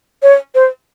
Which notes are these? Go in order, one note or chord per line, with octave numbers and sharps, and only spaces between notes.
C#5
C5